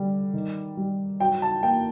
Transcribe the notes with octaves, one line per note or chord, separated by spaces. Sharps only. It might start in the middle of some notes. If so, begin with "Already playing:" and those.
Already playing: D3 G3
D#3
G3
F#3 G5
A5
A#3 G5